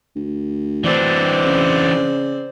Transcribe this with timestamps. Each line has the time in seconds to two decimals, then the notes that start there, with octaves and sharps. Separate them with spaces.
0.16 D2
0.84 E3 C4 D4 D5
1.46 C#3